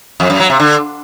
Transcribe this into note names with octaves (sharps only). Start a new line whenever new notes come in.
F2
F#2
F#3
C3
D3